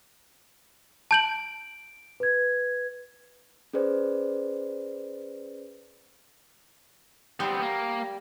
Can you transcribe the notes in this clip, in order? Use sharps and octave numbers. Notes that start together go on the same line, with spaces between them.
A5 G6 D7 F#7
B4 G#6
C#4 G#4 B4 C5 D5
G3 B3 C4
A#3